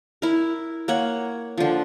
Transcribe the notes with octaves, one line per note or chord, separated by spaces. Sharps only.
E4 A#4
A#3 C#5 F#5
D3 F3